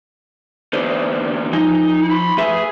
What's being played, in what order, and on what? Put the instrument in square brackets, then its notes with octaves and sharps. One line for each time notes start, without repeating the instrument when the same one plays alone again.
[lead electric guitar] E2 D3 [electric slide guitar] B4 C5 D5
[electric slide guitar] F3 D#5 G#5 [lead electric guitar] D#4
[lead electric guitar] B5 C6
[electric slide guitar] A3 B4 E5 [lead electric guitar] G#4